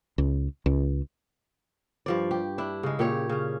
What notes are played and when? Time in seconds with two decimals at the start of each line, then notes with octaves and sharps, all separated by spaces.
0.18 C#2
0.66 C#2
2.06 G2 F3 D5
2.31 G4
2.58 D4 E4
2.83 C#3 G#3
2.99 A#2 G4 C#5
3.30 C#3 C#4